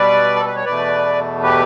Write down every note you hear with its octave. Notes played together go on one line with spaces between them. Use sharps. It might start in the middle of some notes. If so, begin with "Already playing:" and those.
Already playing: B2 G3 B4 D5
A4
B4
C#5
E2 B2 A3 B4 D5
G4 B4